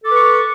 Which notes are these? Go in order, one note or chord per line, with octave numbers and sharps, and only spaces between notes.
A4 B4 C#6 D6